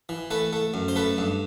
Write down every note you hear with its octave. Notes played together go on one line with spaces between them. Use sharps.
E3
A3 B4
A3
F#2
C5
A3 B4
G2